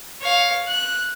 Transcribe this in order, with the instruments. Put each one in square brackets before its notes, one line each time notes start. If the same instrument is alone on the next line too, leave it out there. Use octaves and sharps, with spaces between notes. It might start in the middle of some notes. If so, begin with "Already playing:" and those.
[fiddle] C#5 F5
F#6